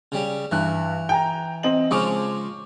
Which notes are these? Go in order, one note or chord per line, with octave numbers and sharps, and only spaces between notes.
C#3 G3
G2 E3 F#6
G5 G#5 A#5
C4 D#5 F#7
C#3 F3 G#3 C#6 D6